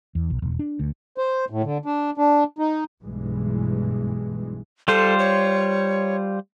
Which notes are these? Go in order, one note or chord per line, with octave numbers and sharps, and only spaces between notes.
E2
B1
E1
D4
D2
C5
A2
D3
D4
D4
D#4
B1 G2 E3 G#3
G3 F4 A4 C5
C#5